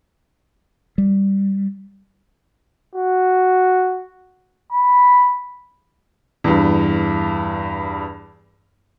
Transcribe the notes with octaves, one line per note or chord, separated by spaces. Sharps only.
G3
F#4
B5
E2 G2